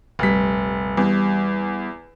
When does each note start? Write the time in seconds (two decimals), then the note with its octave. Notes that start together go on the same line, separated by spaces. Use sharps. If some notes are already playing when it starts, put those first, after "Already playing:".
0.19 F1 A#1 G3 B6
0.97 E2 G3